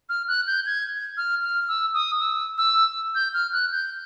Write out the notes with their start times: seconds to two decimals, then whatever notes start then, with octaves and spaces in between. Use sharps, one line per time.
0.09 F6
0.28 F#6
0.47 G6
0.66 G#6
1.17 F6
1.43 F6
1.68 E6
1.94 D#6
2.20 E6
2.58 E6
3.15 G6
3.34 F6
3.53 F#6
3.72 G6